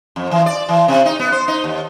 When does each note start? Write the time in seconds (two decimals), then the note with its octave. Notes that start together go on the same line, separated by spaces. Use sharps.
0.16 F2
0.31 E3
0.46 D5
0.69 E3
0.88 C3
1.06 D#4
1.19 B3
1.32 C5
1.48 D#4
1.64 D#2